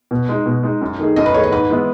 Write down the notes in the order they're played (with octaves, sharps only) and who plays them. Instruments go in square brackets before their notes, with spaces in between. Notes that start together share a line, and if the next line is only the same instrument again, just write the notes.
[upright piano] B2
G#3 D#4
B2
G#3 D#4
F#2
D#3 A3 D#4 G#4
[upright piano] F#2 [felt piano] D#5
[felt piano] B4
[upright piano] D#3 A3 D#4 G#4 [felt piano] C#5
[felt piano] D#5
[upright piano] G#2 [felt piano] B4
[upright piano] E3 G#3 B3 E4